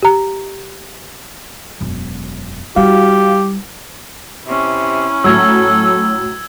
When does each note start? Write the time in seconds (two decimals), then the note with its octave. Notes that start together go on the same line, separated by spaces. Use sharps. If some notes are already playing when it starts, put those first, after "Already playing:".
0.03 G4 A#5
1.80 E1 F#2
2.76 G3 E4 F#4 G4 F5
4.47 C3 C#4 E4
5.24 A2 F#3 A4 E6 G#6